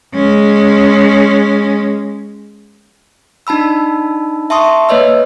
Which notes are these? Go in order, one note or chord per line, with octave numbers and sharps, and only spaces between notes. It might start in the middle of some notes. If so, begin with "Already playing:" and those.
G#3 C#4
D4 D#4 A5 B5 E6
E5 A5 C6 C#6 D#6
A#3 B4 C#5 D#5 E6